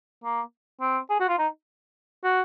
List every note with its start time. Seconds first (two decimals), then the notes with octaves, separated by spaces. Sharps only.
0.24 A#3
0.81 C4
1.10 G#4
1.20 F#4
1.29 F4
1.39 D#4
2.24 F#4